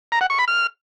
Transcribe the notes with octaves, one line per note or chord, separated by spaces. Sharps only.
A#5
F#5
C#6
B5
F6